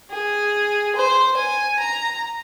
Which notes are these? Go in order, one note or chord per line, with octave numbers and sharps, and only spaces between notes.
G#4
C5
G#5
A#5